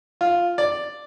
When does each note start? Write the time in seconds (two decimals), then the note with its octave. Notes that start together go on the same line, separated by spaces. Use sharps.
0.21 F4
0.58 D5